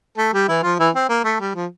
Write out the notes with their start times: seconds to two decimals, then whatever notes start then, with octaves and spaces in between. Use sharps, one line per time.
0.18 A3 A4
0.33 G3 G4
0.48 E3 E4
0.63 F3 F4
0.79 E3 E4
0.95 C4
1.09 A#3
1.24 A3
1.40 G3
1.55 F3